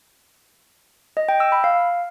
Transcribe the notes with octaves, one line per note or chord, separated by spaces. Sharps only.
D#5
G5
E6
B5
F5